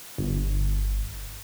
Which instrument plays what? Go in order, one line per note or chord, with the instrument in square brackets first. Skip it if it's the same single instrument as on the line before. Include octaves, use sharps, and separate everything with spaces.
[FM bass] G1